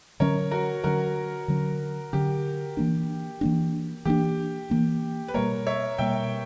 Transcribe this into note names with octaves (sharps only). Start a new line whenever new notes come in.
D3 F#3 C#4 A#4 C#5
F#4 A#4
D3 F#3 C#4 F#4 A#4
D3 F#3 C#4
D3 F#3 C#4 G4
E3 A#3 D4
E3 A#3 D4
E3 A#3 D4 G4
E3 A#3 D4
B4
B2 G3 A#3 A#4 C#5
C#5 E5
B2 G3 A#3 E5 G5